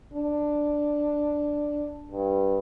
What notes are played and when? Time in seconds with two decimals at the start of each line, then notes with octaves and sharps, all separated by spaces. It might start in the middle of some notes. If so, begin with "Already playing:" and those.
0.13 D4
2.11 G2